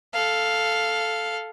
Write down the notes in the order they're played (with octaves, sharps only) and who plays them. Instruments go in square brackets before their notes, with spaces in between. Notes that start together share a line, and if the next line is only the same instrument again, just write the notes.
[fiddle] A4 F5